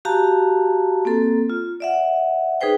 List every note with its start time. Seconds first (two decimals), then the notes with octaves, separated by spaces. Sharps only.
0.05 F#4 G4 F5 A5 A#5
1.05 A#3 C4 A4
1.50 F4
1.80 D5 E5 F#5
2.61 D#4 G#4 B4 C5 G5